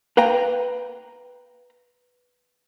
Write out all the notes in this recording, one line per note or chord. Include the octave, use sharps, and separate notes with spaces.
B4 F5 G5 A#5